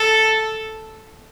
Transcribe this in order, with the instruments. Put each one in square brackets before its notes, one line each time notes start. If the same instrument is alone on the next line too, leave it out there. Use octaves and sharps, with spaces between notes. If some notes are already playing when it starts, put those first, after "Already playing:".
Already playing: [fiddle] A4